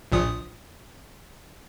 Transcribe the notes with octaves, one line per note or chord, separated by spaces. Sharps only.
A#1 A#2 D#6